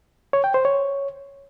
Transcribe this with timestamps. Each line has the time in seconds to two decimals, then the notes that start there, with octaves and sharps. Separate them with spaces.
0.33 C#5
0.44 G5
0.54 C5
0.65 C#5